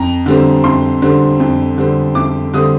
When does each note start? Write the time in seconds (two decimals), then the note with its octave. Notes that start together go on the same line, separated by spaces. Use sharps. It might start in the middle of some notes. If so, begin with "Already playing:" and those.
Already playing: F2 A#5
0.26 D3 G3 C4
0.64 F2 C6
1.02 D3 G3 C4
1.40 F2
1.78 D3 G3 C4
2.15 F2 D6
2.53 D3 G3 C4 D#6